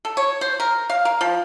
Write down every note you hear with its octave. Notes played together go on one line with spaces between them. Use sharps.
A4
C#5
C5
A#4
F5
A#4
F3